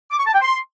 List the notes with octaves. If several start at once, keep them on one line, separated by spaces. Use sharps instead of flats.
D6
C#6
A5
G5
C6